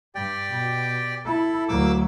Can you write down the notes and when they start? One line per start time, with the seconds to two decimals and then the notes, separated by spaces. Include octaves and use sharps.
0.15 G2 G4 D5 G5
0.51 B2
1.25 E4 A4
1.69 D2 F#3 A#3 D6 E6